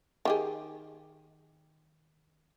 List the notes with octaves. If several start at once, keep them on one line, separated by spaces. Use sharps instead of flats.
D#3 G4 G#4